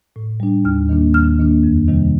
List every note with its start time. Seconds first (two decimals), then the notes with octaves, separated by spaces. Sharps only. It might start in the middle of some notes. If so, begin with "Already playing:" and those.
0.16 A2
0.40 G3 D4
0.65 D#2 F6
0.89 D#3 A#3 D4
1.14 D#2 F6
1.39 D#3 A#3 D4
1.63 F2
1.88 C3 D#3 G3